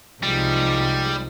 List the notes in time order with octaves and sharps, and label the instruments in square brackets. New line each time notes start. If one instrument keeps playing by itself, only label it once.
[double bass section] C2 [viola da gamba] F3 G#3 D#4 [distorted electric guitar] G3